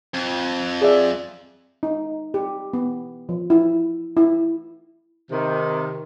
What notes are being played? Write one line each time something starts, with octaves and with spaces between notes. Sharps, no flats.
F2
G#4 D5 E5
D#4
G4
B3
F3
E4
E4
C3 D#3